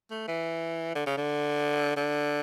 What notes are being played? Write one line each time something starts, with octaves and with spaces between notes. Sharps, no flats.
A3
E3
D3
C#3
D3
D3